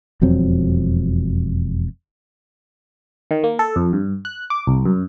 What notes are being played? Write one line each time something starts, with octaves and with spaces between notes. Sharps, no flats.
E1 F2 F#3 C4
D#3
A#3
A4
F2
G2
F#6
D6
C2
F#2